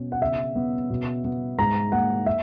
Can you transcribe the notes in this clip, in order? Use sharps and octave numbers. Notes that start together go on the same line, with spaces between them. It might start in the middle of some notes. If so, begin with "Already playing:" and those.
Already playing: B2 C#4
F#5
C#3 E5
B3
B2
B3
G#2 A#5
A#3 F#5
E5